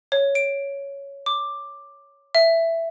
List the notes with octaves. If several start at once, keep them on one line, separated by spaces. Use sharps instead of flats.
C#5
D7
D6
E5